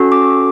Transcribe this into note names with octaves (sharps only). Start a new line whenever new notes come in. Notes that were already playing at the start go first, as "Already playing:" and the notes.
Already playing: C#4 F#4 A4
D6